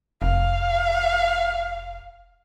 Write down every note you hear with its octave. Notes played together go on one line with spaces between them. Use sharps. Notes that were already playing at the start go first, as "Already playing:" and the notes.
F1 F5